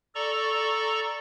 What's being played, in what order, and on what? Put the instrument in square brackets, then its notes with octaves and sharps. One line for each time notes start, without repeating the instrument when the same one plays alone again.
[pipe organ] A4 D5 A#5 C#6